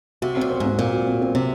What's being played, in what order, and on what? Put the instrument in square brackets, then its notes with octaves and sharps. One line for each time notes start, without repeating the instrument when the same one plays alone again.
[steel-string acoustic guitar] C3 [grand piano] F#4
[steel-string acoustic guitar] A#2 [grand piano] C4
[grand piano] C5
[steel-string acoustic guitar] G#2 [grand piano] C4
[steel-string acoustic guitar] A#2 [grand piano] C4
[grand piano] F#4
C4
C4
[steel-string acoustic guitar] C3 [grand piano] C4